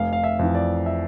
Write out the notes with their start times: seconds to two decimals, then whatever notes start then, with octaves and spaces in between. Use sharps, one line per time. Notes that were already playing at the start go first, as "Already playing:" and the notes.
Already playing: F1 F5
0.13 F5
0.24 E5
0.39 F2 E3
0.55 D5
0.86 E5